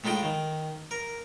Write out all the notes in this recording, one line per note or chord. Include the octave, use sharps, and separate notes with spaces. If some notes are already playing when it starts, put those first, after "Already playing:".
A2 G#3 D#4 F4 G5
D#3
A#4